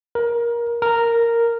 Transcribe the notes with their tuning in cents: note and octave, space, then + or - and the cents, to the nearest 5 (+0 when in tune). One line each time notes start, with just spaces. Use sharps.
A#4 +20
A#4 -5